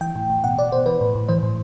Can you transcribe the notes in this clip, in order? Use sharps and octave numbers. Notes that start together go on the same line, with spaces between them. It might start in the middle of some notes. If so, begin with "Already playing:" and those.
E3 G5
A2
A2
B2 F#5
B2 D5
B2 C5
E3 B4
A2
A2
E3 C5
A2